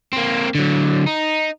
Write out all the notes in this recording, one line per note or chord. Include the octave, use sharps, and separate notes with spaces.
A#3 C4
D3 F#3
D#4